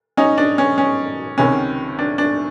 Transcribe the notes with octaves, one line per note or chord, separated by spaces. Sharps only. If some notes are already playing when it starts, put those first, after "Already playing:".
C#4 D#4
D4
C#4
C#4
C#2 C3 D#3 C#4
D4
D4